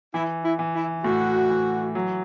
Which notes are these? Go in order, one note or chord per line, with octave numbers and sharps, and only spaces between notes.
E3 E4
E4
E3
E4
A2 F#4
E3
F#3